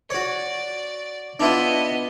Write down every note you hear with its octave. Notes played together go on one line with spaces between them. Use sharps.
F#4 C#5 D5
B3 D4 E4 F4 D#5